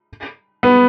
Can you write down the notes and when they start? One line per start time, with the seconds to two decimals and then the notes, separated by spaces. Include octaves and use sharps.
0.63 B3